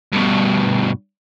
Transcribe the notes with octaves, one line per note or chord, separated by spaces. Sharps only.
G2 B2